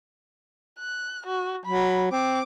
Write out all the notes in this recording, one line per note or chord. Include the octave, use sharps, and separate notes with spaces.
F#6
F#4
F#3 B5
C4 D6